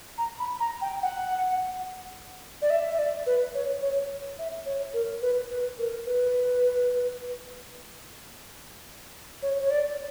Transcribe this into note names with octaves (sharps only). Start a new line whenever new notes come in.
A#5
B5
A#5
G5
F#5
D5
E5
E5
D5
B4
C#5
C#5
E5
C#5
A#4
B4
B4
A#4
B4
C#5
C#5
D5